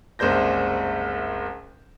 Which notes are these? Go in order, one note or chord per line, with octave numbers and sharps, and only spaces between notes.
F#1 C2 G#3 C5 G6 A#6